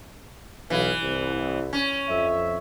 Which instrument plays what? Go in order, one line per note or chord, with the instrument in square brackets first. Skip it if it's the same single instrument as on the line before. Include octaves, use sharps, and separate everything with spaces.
[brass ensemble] B1 B3 F5 [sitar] E3
[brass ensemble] C2
[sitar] C#4
[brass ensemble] F2 E5